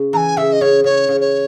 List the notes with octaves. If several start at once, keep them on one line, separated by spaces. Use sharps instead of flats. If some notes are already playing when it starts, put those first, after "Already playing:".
Already playing: C#3
E3 G#5 A#5
C#3 E5
D#5
C#3 C#5
C#3 C#5
C#3
C#5